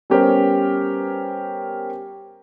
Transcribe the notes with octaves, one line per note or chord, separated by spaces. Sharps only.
G3 B3 C#4 G4 A#4 C5